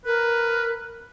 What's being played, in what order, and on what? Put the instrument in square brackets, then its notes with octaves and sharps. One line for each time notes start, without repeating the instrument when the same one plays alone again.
[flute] A#4 [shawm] B4